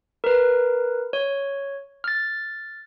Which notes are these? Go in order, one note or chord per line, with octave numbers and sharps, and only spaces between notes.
A#4 B4
C#5
F6 A6